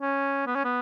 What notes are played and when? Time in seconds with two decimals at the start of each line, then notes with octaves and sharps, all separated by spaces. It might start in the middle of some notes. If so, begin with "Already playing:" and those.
0.01 C#4
0.46 B3
0.55 C#4
0.64 B3